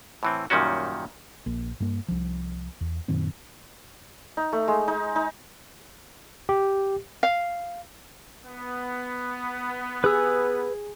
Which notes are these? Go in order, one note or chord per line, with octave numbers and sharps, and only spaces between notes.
A2 E3 C4
F#2 A#2 D#3 G3 C#4 F#4
A#1 A#3
G2 A#3
C2 F3
E2
F#2 A#2 D#3 C4
D#4
A3
G#3
D#4
D#4
G4
F5
B3
G#4 B4 E6